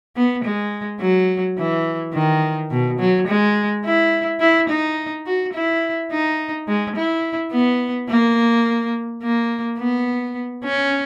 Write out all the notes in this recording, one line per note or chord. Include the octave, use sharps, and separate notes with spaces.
B3
G#3
F#3
E3
D#3
B2
F#3
G#3
E4
E4
D#4
F#4
E4
D#4
G#3
E4
B3
A#3
A#3
B3
C#4